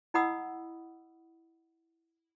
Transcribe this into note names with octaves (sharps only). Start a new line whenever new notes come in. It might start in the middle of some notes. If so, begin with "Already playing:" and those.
E4 D#5 F#5 B5 D#6 E6